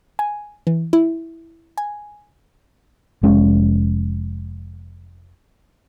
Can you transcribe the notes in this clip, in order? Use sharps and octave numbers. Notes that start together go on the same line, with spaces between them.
G#5
E3
E4
G#5
F1 G#3 C#4